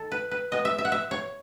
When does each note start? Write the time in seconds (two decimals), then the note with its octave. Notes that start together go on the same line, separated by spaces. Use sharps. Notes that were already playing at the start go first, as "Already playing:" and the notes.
Already playing: D#3 A4
0.12 B4
0.31 B4
0.52 B2 G#3 B3 D#5
0.65 E5
0.78 E5
0.85 F#5
0.92 E5
1.11 C#5